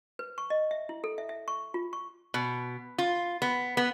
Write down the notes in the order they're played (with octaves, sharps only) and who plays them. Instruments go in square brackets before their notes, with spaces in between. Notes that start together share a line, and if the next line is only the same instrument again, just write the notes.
[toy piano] B4
C#6
D#5
E5
E4
A4
E5
E5
C#6
F4
C#6
[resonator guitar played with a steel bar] B2
F4
B3
B3